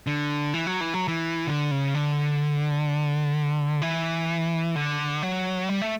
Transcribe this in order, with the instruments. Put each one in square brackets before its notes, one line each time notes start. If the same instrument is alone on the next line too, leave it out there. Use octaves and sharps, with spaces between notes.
[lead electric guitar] D3
E3
F#3
E3
F#3
E3
D3
C#3
D3
E3
D3
F#3
G3
A3